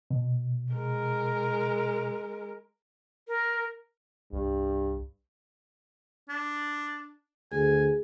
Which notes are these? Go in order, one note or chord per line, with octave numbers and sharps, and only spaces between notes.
B2
G#3 A#4
A#4
C2 G2
D4
D2 G#4 G#5